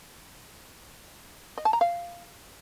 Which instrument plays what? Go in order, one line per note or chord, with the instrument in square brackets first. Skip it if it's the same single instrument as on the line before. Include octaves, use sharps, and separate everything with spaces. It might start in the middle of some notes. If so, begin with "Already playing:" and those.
[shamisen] D#5
A5
A#5
F5